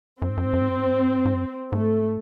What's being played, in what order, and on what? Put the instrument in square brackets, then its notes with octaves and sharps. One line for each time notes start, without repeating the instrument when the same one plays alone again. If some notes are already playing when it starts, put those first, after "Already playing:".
[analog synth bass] F#2 [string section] C4
[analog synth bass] G#2
F#2
G#2
F#2
G#2
F#2
G#2
F#2
G#2
F#2
G#2
F#2
G#2
F#2
[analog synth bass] G#2 [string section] A3